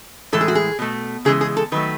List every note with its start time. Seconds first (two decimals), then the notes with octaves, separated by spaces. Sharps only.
0.32 A2 E3 G#3 A4
0.41 G#4
0.48 F#4
0.55 G#4
0.79 B2 A3
1.25 C#3 E3 G#3 G#4
1.41 G#4
1.57 A4
1.72 D#3 F#3 A3 B4